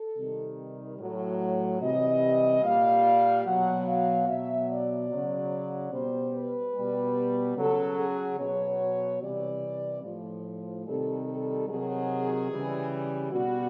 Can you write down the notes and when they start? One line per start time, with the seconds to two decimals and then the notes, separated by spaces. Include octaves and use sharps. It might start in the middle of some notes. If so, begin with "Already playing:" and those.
Already playing: A4
0.16 C3 D#3 G3
0.99 A2 F#3
1.81 C3 E3 G3 D#5
2.63 A#2 G3 F5
3.45 B2 F#3 F#5
3.86 F5
4.27 B2 F#3 E5
4.69 D5
5.10 C#3 F#3
5.92 B2 G3 C5
6.33 B4
6.75 B2 G3
7.56 C#3 F#3 A4
7.98 G#4
8.38 B2 F#3 C#5
9.21 C3 E3 G3 D5
10.03 A2 F3
10.86 C3 D#3 G3 A4
11.28 A4
11.68 C3 D#3 F#3 G#4
12.50 C#3 E3 G3
13.32 B2 G3 F#4